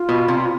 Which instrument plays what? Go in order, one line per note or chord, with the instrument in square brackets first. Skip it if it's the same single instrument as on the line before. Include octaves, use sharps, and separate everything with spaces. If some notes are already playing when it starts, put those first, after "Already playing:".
Already playing: [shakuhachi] F4
[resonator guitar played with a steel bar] B2
C3